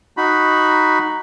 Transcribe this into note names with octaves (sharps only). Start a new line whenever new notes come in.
D#4 F#4 B5